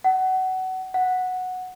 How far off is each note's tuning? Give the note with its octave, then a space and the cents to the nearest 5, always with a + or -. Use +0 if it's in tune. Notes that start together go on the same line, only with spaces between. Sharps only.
F#5 +20
F#5 -10